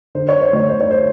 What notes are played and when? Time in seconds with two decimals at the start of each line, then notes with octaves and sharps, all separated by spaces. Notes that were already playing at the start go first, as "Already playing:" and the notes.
0.15 D3 C5
0.29 C#5
0.41 C5
0.53 D2 C#5
0.69 C5
0.81 C#5
0.91 C5